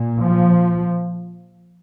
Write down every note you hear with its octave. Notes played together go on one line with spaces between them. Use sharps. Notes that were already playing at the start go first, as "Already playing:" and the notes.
Already playing: A#2
F3